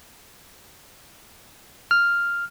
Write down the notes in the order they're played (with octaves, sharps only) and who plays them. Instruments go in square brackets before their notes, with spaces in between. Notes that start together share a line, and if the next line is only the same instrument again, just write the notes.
[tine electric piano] F6